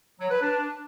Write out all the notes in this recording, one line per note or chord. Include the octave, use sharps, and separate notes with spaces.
F#3
B4
D4